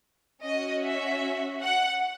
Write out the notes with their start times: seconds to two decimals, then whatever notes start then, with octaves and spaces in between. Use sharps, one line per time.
0.43 C#4 F#4 D#5
0.83 E5
1.62 F#5